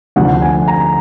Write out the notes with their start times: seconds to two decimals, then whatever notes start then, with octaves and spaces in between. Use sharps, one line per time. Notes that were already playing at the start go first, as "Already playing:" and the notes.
0.16 D2 D3 F3 F#5
0.42 G#5
0.68 A#5